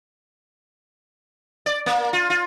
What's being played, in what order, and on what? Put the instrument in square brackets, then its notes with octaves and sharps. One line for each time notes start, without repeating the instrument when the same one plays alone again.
[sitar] D5
A#3
F4
F4